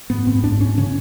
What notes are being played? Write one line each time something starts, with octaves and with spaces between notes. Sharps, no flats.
G#2 B3
G#2 C4
G#2 D4
G#2 C#4
C#3 C#4